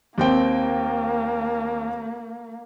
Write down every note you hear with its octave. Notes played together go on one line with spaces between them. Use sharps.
D#2 A#3 C4 G5